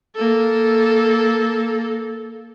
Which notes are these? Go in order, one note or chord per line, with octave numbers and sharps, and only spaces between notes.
A#3 A4